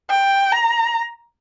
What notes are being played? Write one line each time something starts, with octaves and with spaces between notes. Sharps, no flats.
G5
A#5